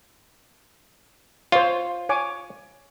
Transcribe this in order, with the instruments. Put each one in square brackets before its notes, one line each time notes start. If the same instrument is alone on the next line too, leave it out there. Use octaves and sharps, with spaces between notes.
[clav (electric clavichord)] F4 [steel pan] C5 C#5
[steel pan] C#5 G#5 D6